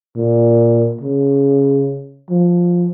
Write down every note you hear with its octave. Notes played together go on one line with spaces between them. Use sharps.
A#2
C#3
F3